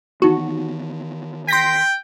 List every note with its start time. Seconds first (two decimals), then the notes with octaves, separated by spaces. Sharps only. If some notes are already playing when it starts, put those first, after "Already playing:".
0.22 D#3 E3 B3 D#4 F#4 C#6
1.48 G5 C6 A#6 B6